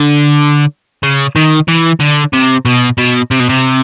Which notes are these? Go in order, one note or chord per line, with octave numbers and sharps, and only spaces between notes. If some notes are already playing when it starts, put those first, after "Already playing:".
Already playing: D3
C#3
D#3
E3
D3
C3
B2
B2
C3
B2
C3